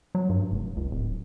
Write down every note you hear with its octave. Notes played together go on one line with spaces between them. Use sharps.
F#3
G2
F1
C#2
D1